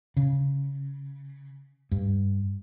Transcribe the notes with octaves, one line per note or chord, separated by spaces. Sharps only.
C#3
G2